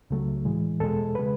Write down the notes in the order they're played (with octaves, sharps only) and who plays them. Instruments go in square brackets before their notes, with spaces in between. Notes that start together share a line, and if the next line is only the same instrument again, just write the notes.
[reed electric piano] C#2 C#3 F#3 A3
A2 E3 G#3
E2 B2 G#3 A4
C#3 G#3 B4